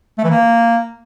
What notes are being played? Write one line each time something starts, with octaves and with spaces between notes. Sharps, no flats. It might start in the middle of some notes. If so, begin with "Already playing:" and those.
A3
E3
A#3